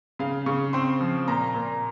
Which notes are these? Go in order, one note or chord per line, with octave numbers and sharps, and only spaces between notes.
C#3 F5
C#3 C#6
C4 C6
F3
A#2 A#5
A#2